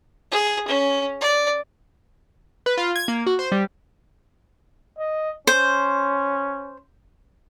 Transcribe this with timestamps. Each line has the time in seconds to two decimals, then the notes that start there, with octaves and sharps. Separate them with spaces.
0.32 G#4
0.68 C#4
1.21 D5
2.66 B4
2.77 F4
2.96 G#6
3.08 A#3
3.26 F#4
3.39 C5
3.52 G3
4.98 D#5
5.47 C#4 C5